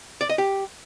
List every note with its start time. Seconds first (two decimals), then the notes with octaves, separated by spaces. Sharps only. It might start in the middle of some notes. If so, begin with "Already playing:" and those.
0.21 D5
0.30 D#5
0.38 G4